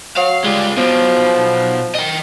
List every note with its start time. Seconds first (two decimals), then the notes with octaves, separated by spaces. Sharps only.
0.17 F#3 F5
0.45 G3 G#3 F4
0.77 B1 B2 F3
1.95 D#5 G5